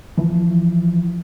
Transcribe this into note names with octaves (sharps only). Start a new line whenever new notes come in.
E3 F3